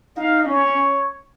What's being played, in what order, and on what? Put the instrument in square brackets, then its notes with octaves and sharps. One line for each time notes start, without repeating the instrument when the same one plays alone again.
[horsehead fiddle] D#4 [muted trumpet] F5
[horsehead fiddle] C#4 [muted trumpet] C#5